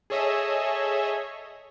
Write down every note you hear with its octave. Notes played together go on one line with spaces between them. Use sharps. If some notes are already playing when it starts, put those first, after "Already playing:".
G#4 A4 C#5 D#5 E5